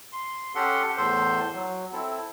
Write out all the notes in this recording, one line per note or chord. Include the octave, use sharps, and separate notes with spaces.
C6
C#4 G4 A4 F#5 C6
E2 A2 A4 C5 C6
F#3
C4 E4 A4